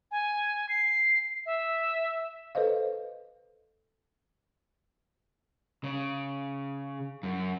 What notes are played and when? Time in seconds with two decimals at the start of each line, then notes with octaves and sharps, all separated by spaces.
0.11 G#5
0.69 C7
1.46 E5
2.55 A4 B4 C5 D#5 F5
5.84 C#3
7.23 F#2